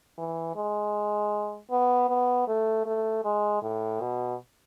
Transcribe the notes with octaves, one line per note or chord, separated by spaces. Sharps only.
E3
G#3
B3
B3
A3
A3
G#3
A2
B2